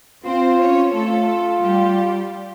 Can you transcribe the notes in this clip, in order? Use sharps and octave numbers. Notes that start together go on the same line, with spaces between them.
C4 F4 C5
C#4 C#5
A3 F4 A4
G3 G4